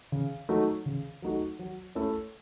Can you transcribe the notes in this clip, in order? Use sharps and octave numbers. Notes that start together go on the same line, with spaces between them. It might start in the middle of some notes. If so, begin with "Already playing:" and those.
C#3
F#3 A3 D#4 F#4
C#3
F#3 A3 D#4 F#4
F#3
A3 C#4 E4 A4